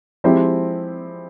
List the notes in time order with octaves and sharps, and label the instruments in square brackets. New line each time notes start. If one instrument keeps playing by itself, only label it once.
[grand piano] F3 G#3 C4 E4 G4